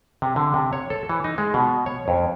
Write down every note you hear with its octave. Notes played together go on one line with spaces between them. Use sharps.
C3
D3
C3
C#5
A4
E3
D#4
G#3
B2
C#5
F2